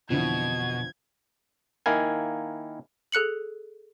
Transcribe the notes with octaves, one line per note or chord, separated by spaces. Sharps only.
F2 B2 D3 E3 G#6
D#3 A#3 E4 F5 G#5
G#4 A4 F#6 C#7 F#7